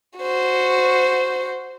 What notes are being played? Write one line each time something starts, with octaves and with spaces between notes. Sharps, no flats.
F#4 C5